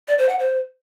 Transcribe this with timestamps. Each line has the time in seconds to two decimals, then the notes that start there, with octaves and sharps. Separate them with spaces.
0.08 D5
0.18 C5
0.29 F#5
0.39 C5